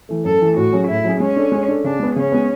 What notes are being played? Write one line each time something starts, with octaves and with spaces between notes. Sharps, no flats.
E3 A3
F#2 A4
E3 A3
A2 F#4
F#3 C#4 G#4
A2 E4
F#3 C#4 G#4
G#3 C#4
D4 A4
G#3
D4 A4
C#3 D4
G#3 B3
C#3 C#4
G#3 B3